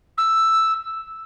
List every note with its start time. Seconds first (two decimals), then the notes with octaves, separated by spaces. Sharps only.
0.17 E6